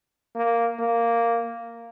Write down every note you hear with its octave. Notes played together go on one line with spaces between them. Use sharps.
A#3
A#3